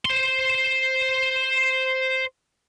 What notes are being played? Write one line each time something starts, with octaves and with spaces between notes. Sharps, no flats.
C5 C6